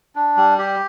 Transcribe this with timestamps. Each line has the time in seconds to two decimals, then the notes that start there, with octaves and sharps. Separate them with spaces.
0.16 D4
0.37 G3
0.59 G4